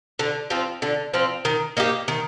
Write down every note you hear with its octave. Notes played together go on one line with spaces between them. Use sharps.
D3
F3 C4 F4
D3
F3 C4 F4
D#3
A#3 D#4 G4
D#3